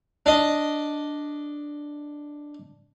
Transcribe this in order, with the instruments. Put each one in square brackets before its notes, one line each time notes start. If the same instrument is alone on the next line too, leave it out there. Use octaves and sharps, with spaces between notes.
[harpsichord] D4 D#5